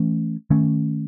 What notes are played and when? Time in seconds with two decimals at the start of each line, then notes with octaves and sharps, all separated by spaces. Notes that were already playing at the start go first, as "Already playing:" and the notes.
Already playing: E3 A3 C#4
0.50 D#3 A3 C#4